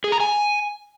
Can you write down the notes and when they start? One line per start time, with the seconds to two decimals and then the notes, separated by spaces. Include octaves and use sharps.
0.04 G#4
0.12 A#5
0.20 G#5